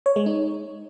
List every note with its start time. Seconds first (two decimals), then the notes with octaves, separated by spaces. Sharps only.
0.06 C#5
0.16 G#3
0.26 D#4